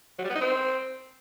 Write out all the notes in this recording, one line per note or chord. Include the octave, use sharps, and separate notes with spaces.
F#3
G3
B3
D#4
C4